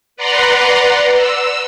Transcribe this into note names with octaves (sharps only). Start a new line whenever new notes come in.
B4 D5 F#5 A#5 C6
E6